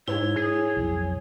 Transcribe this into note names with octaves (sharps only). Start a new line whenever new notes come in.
G#2 E4 C#5
G#4
B1 F2